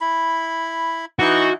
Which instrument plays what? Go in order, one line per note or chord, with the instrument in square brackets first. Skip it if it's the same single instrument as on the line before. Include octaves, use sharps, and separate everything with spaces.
[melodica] E4 B5
[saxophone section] E3 D#4 [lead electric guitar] F#4 [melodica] C#6